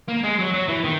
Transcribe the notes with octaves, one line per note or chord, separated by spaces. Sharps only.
A#3
G#3
F#3
F#3
E3
D#3